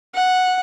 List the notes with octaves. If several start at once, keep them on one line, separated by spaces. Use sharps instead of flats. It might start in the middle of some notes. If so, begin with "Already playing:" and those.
F#5